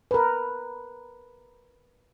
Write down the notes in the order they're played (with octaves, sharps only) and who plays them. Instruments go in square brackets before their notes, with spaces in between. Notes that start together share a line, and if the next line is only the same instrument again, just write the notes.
[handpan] A#4 B4